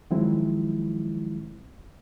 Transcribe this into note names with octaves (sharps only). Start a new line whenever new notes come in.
D#3 F3 F#3 G#3 C4 E4